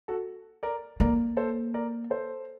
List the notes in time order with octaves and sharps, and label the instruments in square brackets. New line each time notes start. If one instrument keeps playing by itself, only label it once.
[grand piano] F#4 A4
A#4 D5
[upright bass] A#3 [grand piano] A#4 D5
[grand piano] A4 C5
A#4 D5
A4 C5